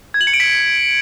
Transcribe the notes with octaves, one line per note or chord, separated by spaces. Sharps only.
G#6
F#7
C#7
D7
B6